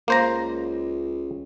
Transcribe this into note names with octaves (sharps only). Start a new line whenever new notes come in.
C#2 A#3 C5 A#5